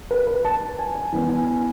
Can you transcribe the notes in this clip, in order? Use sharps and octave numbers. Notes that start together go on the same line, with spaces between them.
B4
B4
A5
G#5
G#5
E3 B3 D4 G#5
G#5
G#5